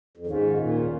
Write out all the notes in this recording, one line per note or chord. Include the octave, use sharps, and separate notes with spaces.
F2
D#2 G#2 D#3 C#4 F4
A#2